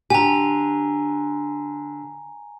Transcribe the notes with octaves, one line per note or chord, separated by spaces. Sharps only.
D3 G4 G#5 A#5